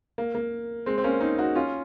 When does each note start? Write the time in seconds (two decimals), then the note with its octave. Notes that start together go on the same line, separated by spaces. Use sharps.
0.18 A#3
0.35 A#3
0.86 G#3 C4
0.98 C4
1.04 A#3 C#4
1.20 C4 D#4
1.38 D#4 F#4
1.55 C#4 F4